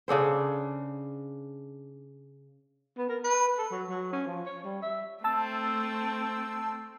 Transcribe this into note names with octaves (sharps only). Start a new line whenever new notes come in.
C#3 D4 A4 C5
B3
A#4
B4
A4
F#3
F#3
C#4
F3
C#5
G3
E5
A3 C4 A5 E6 A6